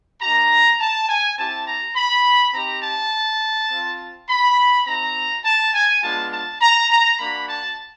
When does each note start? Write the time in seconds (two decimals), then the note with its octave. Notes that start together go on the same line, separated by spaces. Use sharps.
0.21 A#3 D#4 G4 A#5
0.79 A5
1.08 G#5
1.37 C4 E4 G4 A5
1.67 A#5
1.95 B5
2.53 C4 D#4 G4 A#5
2.82 A5
3.70 C4 F4
4.28 B5
4.86 C4 D#4 F#4 A#5
5.44 A5
5.73 G#5
6.02 G#3 B3 D4 F4 A5
6.31 A5
6.61 A#5
6.90 A#5
7.19 A#3 D4 F#4 B5
7.48 A5